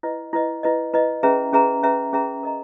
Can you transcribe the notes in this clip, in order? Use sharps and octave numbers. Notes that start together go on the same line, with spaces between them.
E4 B4 D#5
E4 B4 D#5
E4 B4 D#5
E4 B4 D#5
C#4 G#4 B4 E5 A#5
C#4 G#4 B4 E5 A#5
C#4 G#4 B4 E5 A#5
C#4 G#4 B4 E5 A#5
A#4 D#5 A#5